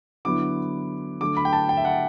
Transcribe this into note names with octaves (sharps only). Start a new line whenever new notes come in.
D3 F#3 B3 E4 D6
D3 F#3 A3 D6
B5
G5
A5
G5
E5
F#5